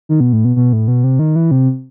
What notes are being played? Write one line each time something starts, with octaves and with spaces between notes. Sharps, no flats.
D#3
B2
A2
B2
B2
A2
B2
C3
D#3
E3
C3